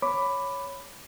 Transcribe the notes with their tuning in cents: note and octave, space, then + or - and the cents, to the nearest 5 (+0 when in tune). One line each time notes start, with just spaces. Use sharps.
C#5 +0 B5 +10 D6 +0